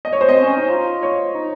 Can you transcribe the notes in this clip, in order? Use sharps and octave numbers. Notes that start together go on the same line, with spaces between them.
D#5
C#5
C5
C4 D#5
C#4
D#4
F4
C#5
D#4